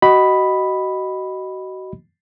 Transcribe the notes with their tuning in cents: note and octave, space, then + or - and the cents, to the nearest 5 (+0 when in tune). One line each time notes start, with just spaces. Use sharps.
F#4 +30 D#5 +0 B5 +0